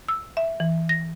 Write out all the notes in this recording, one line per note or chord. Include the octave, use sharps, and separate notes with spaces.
E6
E5
E3
A#6